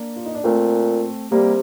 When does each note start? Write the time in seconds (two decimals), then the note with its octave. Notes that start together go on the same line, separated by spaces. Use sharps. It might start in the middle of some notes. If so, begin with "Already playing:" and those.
Already playing: A#3 D4
0.16 F4
0.26 D#4
0.35 D4
0.44 A#2 A3 C4
1.32 C3 G3 A#3